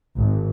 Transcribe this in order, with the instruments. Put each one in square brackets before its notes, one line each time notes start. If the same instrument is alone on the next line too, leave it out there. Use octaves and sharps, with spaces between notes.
[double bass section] G#1